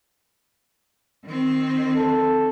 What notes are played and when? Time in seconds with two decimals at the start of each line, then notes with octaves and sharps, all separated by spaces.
1.24 D#3 C4
1.97 A4